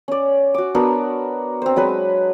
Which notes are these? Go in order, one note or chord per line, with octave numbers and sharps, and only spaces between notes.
C#4 D5
F#4 D6
B3 D4 F#4 A#4
C4 C5
F#3 G#3 B4